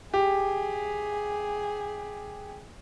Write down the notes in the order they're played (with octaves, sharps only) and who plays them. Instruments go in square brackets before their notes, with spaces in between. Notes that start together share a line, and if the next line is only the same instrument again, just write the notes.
[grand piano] G4 [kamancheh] G#4